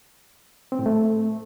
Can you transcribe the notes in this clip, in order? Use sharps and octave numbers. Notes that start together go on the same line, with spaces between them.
C4
A2
A3